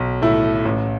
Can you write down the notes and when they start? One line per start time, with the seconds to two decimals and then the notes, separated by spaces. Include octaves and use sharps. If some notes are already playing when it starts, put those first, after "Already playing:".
Already playing: B1
0.22 A2 A3 E4
0.65 A1